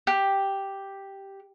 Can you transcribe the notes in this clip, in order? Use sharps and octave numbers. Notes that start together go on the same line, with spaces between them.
G4